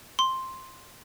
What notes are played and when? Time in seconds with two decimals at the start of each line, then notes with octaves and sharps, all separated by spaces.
0.19 C6